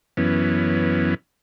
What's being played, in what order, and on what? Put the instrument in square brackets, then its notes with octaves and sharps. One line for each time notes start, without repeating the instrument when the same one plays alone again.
[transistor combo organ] F#2 E3 B3 C#4